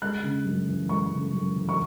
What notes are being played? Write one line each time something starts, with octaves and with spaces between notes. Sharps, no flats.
G#3 F#6
C#3
F#2
E3
G#3 C#6
C#3
F#2
E3
C#6